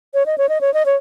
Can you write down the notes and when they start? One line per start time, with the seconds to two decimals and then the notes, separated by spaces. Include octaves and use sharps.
0.14 C#5
0.26 D#5
0.38 C#5
0.49 D#5
0.61 C#5
0.74 D#5
0.86 C#5